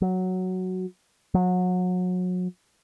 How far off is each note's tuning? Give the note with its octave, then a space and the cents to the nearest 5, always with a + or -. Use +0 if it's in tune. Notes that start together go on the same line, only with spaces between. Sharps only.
F#3 +0
F#3 -30